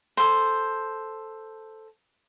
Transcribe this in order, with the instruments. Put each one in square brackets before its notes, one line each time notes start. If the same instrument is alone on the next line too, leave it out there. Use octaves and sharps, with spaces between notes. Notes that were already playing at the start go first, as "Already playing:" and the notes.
[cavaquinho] A4 C5